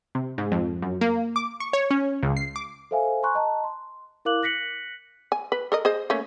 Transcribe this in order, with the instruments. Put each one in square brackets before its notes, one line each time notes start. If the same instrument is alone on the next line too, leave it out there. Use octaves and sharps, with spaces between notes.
[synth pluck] C3
G#2
F2
F#2
A#3
D6
C#6
C#5
C#4
C#2
C7
D6
[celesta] A4 C5 E5 F5 G#5
G#5 A#5 C6 C#6 F#6
D#5 A5 A#5
C6
E4 A#4 F5 D6 F#6 F#7
F#6 A#6 B6 C#7 F#7
[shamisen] G#5
B4
A4 A#4 D#5
G#4 C5 D#5
A3 A#3 C#4